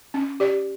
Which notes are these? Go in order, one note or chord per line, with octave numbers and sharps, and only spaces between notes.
C#4
G4 D5